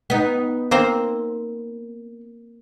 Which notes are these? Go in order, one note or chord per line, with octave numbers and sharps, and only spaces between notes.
B3 D#4
A#3 C4 C5